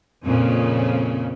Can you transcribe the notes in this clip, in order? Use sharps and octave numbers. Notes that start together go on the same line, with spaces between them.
F2 A#2 C#3